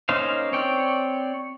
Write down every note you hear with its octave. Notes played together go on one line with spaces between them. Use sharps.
A#3 C#4 D#4 C5 F5
C4 C#5 D5 G5